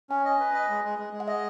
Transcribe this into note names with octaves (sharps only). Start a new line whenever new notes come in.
C#4 G#5
D#5
B4
D#5
G#3
G#3
G#3
G#3
F#5
D#5 E5